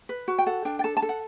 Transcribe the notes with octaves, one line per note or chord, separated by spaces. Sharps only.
B4
F#4
G5
A4 F#5
D4 G5
G5
A4 A5
A5
A4
F#5